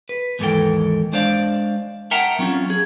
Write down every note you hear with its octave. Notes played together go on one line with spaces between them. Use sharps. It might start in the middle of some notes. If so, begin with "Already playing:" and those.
B4
D#2 G#2 E3 A4 A#4 G5
G#3 D4 C5 D5 F5
A#4 E5 F#5 G5 A5 A#5
F#3 C4 C#4 F4
G#4